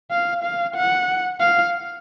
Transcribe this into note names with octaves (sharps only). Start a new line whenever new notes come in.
F5
F5
F#5
F5